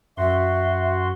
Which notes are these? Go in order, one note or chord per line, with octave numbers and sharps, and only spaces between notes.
F#2 F#4 E5 C6